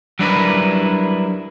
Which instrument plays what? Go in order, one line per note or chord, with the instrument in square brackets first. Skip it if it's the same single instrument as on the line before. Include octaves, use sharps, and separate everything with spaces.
[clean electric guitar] F#3 G3 D4 E4 A#4 B4